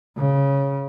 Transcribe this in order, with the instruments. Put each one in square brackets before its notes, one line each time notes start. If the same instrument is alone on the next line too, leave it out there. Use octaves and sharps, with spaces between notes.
[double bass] C#3